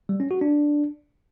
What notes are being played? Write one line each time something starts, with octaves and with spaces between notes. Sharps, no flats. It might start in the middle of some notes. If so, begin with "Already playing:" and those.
G3
C#4
F#4
D4